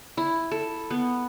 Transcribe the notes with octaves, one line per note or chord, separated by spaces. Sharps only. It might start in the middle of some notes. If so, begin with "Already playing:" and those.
E4
A4
B3